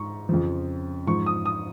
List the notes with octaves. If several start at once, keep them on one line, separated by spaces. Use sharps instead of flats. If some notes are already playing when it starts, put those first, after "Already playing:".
Already playing: G#2 C#6
F2 C#3 F3
G#2 F3 C#6
D#6
D#6